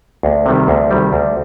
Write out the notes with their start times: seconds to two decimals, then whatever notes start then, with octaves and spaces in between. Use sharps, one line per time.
0.23 D2
0.46 C3 D#3 G3
0.68 D2
0.91 C3 D#3 G3
1.13 D2